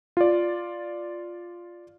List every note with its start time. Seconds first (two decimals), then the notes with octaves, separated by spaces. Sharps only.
0.17 F4 D5